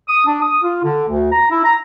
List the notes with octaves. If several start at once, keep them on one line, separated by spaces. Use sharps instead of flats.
D#6
D4
D#6
F4
D3
D2
A#5
E4
A#5